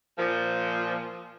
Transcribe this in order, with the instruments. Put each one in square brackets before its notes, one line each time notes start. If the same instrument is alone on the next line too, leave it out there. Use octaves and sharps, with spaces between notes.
[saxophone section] A#2 F3